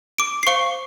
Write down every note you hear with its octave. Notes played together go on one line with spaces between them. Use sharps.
D6 D7
C7
C5 F5 C#6 C#7